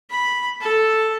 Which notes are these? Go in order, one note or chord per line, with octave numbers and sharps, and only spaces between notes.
B5
A4